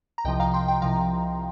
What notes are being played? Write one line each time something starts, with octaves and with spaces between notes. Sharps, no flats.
A#5
C2 C3 F3 D#5 G5
F5 A#5
G5 C6
G5 C6
C2 C3 F3 F5 A#5